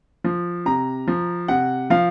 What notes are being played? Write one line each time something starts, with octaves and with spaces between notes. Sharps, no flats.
F3
C3 A#5
F3
C3 F#5
F3 F5